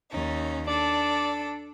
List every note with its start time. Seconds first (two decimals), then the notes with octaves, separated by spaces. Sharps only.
0.11 D#2 C#4 D#4
0.68 D4 A4 D5